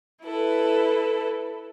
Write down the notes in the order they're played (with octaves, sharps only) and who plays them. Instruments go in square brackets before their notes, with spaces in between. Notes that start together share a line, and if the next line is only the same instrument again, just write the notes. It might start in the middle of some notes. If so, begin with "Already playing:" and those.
[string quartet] E4 A4 B4